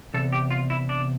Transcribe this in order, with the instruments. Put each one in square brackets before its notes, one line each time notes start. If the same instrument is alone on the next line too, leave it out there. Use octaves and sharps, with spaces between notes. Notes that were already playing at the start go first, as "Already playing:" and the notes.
[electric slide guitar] E2 C3 A4
G4
F4
E4
D4